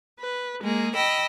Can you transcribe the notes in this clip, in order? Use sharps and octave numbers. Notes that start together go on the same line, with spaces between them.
B4
G#3 A#3 G#4
D#5 G5 B5 E6